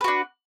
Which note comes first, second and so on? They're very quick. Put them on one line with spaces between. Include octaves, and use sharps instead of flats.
B4 F#4 D4